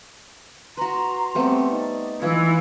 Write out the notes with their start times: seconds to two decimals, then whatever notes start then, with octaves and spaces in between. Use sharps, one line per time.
0.77 F#4 B4 A#5 C6
1.35 G3 A3 B3 C4
1.72 D#4 D5
2.22 E3 F4 B4 E6 G#6